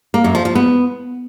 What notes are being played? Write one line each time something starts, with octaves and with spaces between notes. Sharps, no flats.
A#3
F#2
F3
F3
B3